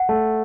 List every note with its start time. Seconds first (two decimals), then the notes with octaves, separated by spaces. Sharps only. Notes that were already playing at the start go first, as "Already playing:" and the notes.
Already playing: F#5
0.09 A3